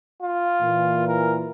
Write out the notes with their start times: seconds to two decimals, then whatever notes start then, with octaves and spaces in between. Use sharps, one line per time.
0.23 F4
0.62 A#2 E3
1.08 A#4